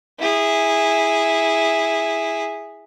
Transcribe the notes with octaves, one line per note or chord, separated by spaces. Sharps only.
E4 G#4